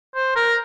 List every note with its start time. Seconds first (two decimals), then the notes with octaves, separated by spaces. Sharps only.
0.15 C5
0.36 A#4